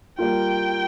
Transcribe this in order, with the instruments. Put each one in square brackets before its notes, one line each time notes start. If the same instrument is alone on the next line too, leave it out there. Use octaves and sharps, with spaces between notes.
[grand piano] G3 A#3 F4 [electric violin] G5